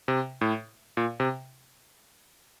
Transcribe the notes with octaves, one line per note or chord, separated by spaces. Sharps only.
C3
A2
A#2
C3